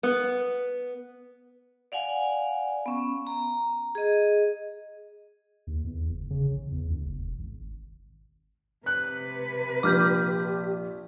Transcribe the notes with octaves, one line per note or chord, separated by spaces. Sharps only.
B3
D5 F5 F#5 G#5
B3 C#4
A#5
G#4 D#5
D#2
E2
F#1
C#3
A1
E2
D2
F#1
E1
G#1
C3 B4 F#6
A#1 G4 D6 F6 G6